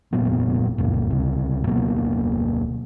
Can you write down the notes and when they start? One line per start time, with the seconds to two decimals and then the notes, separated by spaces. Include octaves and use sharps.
0.13 F1 A#2 F#3 B3
0.78 F1 C#2 F#2 A#2
1.10 C#2 C3
1.67 D1 B2 F#3 A#3